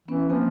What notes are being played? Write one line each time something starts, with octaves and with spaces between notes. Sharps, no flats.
E3 B3 C#4
F3 A#3 C4